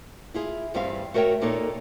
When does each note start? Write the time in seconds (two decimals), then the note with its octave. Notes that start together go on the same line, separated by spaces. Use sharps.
0.34 E4 F4 G#4
0.74 E2 G2 G3 C4 F5
1.14 A3 F#4 A#4 C#5 G5
1.41 A#2 A#3 D#4 A4 C#5